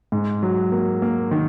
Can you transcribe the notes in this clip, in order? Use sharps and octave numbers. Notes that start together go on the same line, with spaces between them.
G#2
F#3
A#3
A#3
D#3